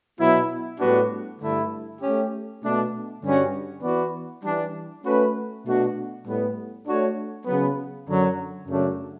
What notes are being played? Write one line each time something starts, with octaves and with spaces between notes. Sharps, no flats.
B2 F#3 B3 E4
A2 G3 B3 D4 F#4
G2 D3 A3 E4
A3 C#4 G4
B2 A3 D4
G2 D3 G3 C#4 F#4
E3 B3 F#4 B4 D5
E3 G3 D4
A3 C#4 F#4 B4
B2 A3 D4 F#4
A2 G3 B3
A3 D4 F#4 C#5
C#3 F#3 B3
F#2 D3 F#3
F#2 C#3 F#3 A3 D4